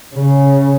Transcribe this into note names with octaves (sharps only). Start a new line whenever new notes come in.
C#3